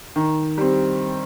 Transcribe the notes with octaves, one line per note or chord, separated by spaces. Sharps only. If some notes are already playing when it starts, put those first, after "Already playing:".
D#3
G3 C4